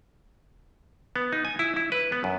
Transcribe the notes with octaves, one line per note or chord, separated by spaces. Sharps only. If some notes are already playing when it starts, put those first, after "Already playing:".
B3
D#4
G#5
E4
E4
B4
B3
F#2